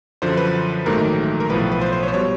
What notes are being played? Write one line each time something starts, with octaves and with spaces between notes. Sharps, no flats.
F#2 D3 F3 C5
B4
A#1 G#2 D#3 F#3 A3 A#4
A#4
B1 A2 F3 B4
B4
C5
C5
C#5
C5
B2 G3 C#5